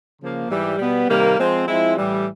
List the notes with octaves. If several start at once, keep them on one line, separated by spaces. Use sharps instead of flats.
C#3 F3 A#3
G#2 E3 G3
B2 G3 B3
C3 D#3 G3 A#3
F3 G#3 C4
F3 G#3 C4 E4
A2 E3 G3